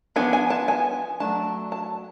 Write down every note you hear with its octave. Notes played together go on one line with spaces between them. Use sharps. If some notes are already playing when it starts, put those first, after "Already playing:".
F3 B3 D4 G#5
G#5
A5
G#5
F#3 A3 D4 A5
A5